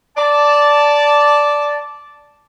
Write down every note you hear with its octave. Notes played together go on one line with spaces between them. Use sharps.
D5 A5